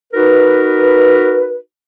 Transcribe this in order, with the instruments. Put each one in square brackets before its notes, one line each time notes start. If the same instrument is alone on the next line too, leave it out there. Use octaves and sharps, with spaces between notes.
[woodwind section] D#4 F#4 A#4 B4